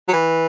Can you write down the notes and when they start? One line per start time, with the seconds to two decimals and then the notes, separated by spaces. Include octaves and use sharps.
0.08 F#3
0.13 E3